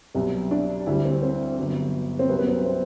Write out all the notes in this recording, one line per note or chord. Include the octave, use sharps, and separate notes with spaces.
C2 B2 F#3
D4
D2 D3 G3 E4
C4
C4
G1 G2 F#3
C4
C2 C3 F#3 B3
B3
C4
C4